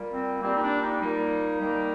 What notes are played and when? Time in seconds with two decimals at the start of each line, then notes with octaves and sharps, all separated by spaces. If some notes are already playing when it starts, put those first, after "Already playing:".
Already playing: A#2 G3 A#3
0.12 C4
0.41 A#2 G3 A#3 C4
0.56 D#4
0.61 D4
0.80 D#4
1.00 A#2 G3 A#3
1.58 D#3 G3 A#3